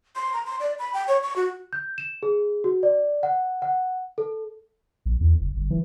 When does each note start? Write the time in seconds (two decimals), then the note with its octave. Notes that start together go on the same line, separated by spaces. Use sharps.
0.16 C6
0.34 A#5
0.46 C6
0.60 D5
0.79 B5
0.94 G5
1.08 C#5
1.23 C#6
1.36 F#4
1.73 G6
1.98 E7
2.23 G#4
2.64 F#4
2.83 D5
3.23 F#5
3.62 F#5
4.18 A4
5.06 A#1
5.21 E2
5.41 F#1
5.57 G1
5.70 E3